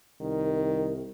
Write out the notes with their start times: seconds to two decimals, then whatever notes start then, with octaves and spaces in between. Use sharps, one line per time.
0.21 C2 D#3